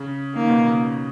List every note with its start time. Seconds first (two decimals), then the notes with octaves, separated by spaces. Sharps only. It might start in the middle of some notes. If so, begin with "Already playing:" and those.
Already playing: C#3
0.35 D#3 A#3
0.50 B2
0.66 C#3